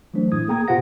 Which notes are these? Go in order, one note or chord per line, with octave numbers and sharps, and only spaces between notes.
E3 F#3 A3 D4 C5
A2 E4 D#6 G#6
A#3 G#4 G5 A#5 D#6 G#6
B2 F4 G4 C5 F#5 A#6